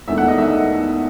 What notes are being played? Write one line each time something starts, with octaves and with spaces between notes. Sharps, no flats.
E1 E2 D#3 A3 E5
F#5
D#5
D#3 A3 E5